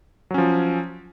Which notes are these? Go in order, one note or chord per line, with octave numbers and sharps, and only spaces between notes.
F3 F#3 C#4